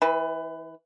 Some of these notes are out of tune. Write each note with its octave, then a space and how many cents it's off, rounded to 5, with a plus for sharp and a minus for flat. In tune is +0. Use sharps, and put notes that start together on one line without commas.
E3 -25 B4 +25